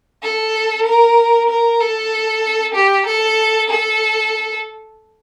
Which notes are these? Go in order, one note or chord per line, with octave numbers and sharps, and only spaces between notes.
A4
A#4
A#4
A4
G4
A4
A4